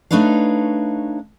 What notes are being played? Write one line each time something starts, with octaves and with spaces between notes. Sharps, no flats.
A3 D4 D#4 B4 C#5 F5